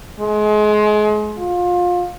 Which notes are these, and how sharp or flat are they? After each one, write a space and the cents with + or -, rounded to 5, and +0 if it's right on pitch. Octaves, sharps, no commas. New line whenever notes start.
G#3 +30
F4 +25